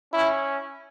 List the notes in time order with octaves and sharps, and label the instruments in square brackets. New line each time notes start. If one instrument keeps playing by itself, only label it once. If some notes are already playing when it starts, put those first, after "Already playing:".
[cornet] C#4 [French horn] E4